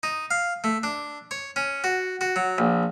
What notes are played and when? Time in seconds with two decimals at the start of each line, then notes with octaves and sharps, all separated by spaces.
0.03 D#4
0.31 F5
0.64 A3
0.83 D4
1.31 C#5
1.56 C#4
1.84 F#4
2.21 F#4
2.36 F#3
2.58 A#1